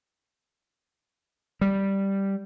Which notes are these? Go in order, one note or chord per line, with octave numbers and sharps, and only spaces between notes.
G3